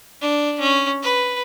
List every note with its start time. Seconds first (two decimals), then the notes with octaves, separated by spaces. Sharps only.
0.21 D4
0.60 C#4
1.02 B4